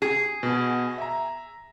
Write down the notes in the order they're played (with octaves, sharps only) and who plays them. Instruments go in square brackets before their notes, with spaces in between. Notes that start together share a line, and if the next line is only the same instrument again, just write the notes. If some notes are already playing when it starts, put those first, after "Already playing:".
[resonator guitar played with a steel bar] G#4
[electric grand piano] B2 F#4
E5 A#5